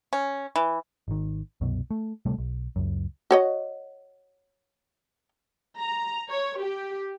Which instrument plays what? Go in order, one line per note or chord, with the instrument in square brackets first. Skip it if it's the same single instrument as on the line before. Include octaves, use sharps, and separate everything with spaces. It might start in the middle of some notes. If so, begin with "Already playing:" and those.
[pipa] C#4
E3
[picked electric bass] G#1 D#3
C2 F#2 B2
A3
D1 C3 G3 A3
B1
C#2 F#2
[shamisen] F#4 C#5 D#5
[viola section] A#5
C#5
G4